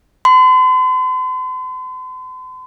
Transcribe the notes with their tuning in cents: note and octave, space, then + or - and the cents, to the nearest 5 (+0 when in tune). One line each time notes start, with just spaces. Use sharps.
C6 -45